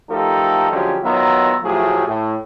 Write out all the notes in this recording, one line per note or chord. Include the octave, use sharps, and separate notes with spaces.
F3 A3 D#4 G4 A4 A#4
D3 F3 F#3 G#3 C#4 G4
D#3 F#3 B3 F4 E5 A#5
A2 F3 F#3 A3 G4 G#4
A2